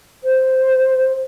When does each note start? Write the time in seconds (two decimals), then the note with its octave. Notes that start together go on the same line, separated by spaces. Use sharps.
0.24 C5